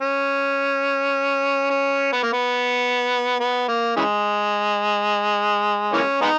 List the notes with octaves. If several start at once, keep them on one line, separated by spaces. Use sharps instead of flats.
C#4
C#4
B3
A#3
B3
B3
A#3
C#3 E3 G#3
E3 A#3 C#4
G#3 B3 D#4